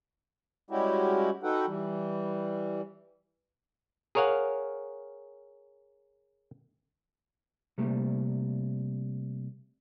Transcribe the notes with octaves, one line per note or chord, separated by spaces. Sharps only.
G3 G#3 C#4 E4 F#4 G4
D#4 F#4 A4 B4 F#5 G5
E3 G3
G#4 A#4 C#5 F5 F#5
C3 G3 A3 A#3